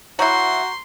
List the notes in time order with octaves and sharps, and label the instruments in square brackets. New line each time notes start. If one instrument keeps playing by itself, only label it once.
[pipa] F#3 E4 [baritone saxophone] F#4 [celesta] A#5 C#6 G6 [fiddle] C6